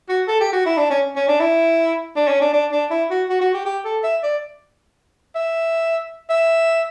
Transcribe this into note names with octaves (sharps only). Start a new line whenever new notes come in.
F#4
A4
G4
F#4
E4
D4
C#4
C#4
D4
E4
D4
C#4
D4
D4
D4
E4
F#4
F#4
F#4
G4
G4
A4
E5
D5
E5
E5